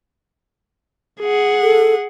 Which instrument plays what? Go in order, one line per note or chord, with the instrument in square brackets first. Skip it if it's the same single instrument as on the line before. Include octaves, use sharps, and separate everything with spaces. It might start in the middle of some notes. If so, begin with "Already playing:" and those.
[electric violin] G#4 F#5
[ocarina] A4